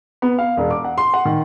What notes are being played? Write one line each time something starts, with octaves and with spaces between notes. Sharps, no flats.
B3
F5
E1
D6
F#5
C6
F#5
D#3